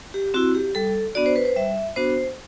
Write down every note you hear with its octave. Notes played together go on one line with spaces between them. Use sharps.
G4
C4 E4 F#4
G4
G3 A4
B3 D4 F#4 D5
C5
B4
C5
G3 E5
B3 D4 F#4 C5